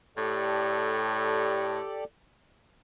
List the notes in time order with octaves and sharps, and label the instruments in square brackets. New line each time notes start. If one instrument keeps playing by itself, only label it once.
[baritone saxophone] A2 [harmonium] G4 A4 D5